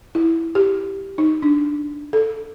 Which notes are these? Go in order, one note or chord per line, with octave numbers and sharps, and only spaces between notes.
E4
G4
D#4
D4
A4